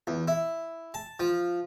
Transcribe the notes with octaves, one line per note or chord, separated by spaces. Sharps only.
E2
E4
A5
F3